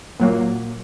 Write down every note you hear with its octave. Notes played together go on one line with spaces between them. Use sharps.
A#2 F#3 A#3